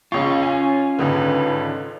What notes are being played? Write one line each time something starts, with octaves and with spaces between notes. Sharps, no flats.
C#2 C#4 F4 C#6
G#5
G#1 C#2 D3 D#4 A4 B4